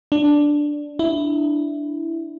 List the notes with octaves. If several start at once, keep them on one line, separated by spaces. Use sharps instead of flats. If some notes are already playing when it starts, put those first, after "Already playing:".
D4
E4